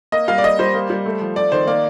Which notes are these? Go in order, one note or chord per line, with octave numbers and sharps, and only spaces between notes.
A#3 D#5
G3 F5
D5
A#3 D#5
G3 C5
A#3
G3
A3
F3
A3 D5
D#3 C5
A#3 D5